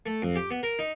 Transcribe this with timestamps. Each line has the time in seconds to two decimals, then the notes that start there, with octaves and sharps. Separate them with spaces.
0.06 A3
0.22 F2
0.36 G4
0.51 B3
0.63 A#4
0.79 D#4